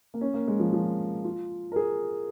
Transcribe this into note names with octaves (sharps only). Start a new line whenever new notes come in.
A#3
C#4
A#3
G#3
F3
F3
F4
A#4
G#4